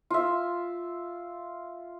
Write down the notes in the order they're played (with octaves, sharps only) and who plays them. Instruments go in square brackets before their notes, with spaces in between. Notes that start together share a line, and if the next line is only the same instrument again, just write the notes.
[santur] F4 E5